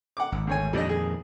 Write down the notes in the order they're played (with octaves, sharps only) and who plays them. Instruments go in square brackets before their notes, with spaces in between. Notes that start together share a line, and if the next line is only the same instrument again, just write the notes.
[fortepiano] F#5 D6
[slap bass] G#1
[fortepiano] D2 C#5 G#5
[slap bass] F2 A#2 D#3 [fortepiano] G3 D4 D#5
[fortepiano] G#4